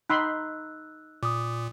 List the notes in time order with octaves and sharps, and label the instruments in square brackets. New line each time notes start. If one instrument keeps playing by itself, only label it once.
[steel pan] D#4 B5 C6 [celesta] E6 F#6
[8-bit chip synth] A#2 [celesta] D6 D#6